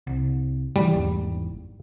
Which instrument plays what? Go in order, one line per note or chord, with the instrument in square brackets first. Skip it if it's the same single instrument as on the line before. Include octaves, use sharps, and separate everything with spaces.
[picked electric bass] C2
[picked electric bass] D#3 E3 A3 [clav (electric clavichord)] G3
[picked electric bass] G#1 E2 G#2